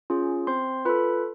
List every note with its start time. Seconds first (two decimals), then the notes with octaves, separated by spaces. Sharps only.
0.10 C#4 F4 G#4
0.47 C4 C5 C6
0.85 F4 A4 B4 B5